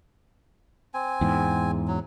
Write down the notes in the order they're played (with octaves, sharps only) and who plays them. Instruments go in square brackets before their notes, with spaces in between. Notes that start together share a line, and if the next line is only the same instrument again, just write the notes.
[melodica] C4 G#5
[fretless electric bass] E2 G#2
[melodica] F#3